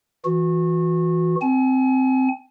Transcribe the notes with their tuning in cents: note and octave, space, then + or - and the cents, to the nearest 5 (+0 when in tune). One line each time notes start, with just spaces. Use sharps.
E3 +0 F#4 -30
C4 -5 G#5 +35